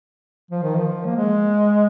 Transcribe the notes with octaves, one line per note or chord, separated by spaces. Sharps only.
F3
D#3
F3
A#3
G#3